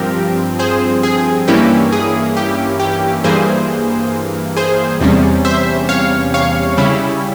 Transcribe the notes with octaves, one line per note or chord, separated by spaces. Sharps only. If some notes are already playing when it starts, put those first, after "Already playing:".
Already playing: G2 F3 C4 G4 A#4
G#4 C5
G#4
G2 E3 A#3 C#4 E4 G4
G#4
G4
G4
G2 E3 A#3 G#4 C5
G#4 C5
E2 C3 G3 C#4
C5 E5
C#5 F5
C#5 F5
C#3 G3 C#4 E4